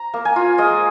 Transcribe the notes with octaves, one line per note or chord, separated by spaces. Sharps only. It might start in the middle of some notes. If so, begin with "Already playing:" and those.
Already playing: A#5
A#3
G#5
F4
G#3 D#5